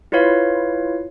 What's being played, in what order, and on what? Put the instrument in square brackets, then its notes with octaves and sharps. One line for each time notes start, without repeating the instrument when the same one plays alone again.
[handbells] E4 F4 B4 C#5 F5